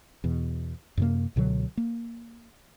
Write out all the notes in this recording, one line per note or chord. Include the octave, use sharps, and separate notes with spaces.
E2 B2
F#2 C3 A#3
C#2 B2 D3 F#3
A#3